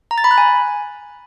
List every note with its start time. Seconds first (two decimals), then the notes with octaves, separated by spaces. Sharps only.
0.11 A#5
0.18 A6
0.24 B5
0.31 F#6
0.38 G#5